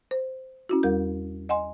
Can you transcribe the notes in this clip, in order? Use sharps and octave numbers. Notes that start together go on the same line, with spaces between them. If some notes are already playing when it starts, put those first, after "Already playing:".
C5
C#4 E4 F#4
E2 G3 A#4 G6
D#5 F#5 G#5 C6